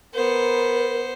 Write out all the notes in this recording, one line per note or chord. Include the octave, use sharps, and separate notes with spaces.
B3 A#4 C5